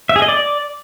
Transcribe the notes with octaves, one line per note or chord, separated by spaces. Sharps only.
E5
G#4
D#5
D5